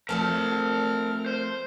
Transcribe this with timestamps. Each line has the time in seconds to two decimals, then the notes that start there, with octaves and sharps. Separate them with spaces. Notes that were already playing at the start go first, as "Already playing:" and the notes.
0.09 F3 A3 C4 A#4 A5 F6
1.26 C5